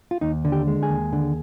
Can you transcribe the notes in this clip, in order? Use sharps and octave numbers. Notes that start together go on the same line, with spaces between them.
F4
D#2 D#4
D3
G4
G#3
G#4
D#2
D3